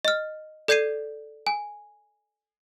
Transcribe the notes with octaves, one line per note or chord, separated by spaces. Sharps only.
D#5 F6
A4 D5 G6 G#6 C7 D#7
G#5